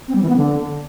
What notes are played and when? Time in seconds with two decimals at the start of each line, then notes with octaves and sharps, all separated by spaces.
0.08 C4
0.15 G3
0.22 E3
0.29 B3
0.36 D3